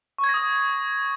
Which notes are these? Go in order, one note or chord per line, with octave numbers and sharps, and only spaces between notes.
C#6
G#6
A#6
D#6